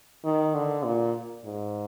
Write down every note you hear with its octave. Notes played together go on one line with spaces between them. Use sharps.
D#3
D3
A#2
G#2